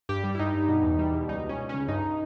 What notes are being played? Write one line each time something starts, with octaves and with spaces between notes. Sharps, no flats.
G2 G4
G3
E4
G2 D#4
G2
B2
E2
G3
B2
C#2 D#4
C#2
C#4
C#2
C#4
C#3
G2 D#4